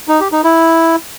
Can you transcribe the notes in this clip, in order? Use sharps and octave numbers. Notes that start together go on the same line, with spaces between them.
D#4
G4
D#4
E4